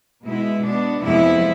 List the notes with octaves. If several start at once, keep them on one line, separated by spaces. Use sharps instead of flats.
B2 G#3 B3 E4
B2 B3 D4
F2 C3 F3 G#3 B3 E4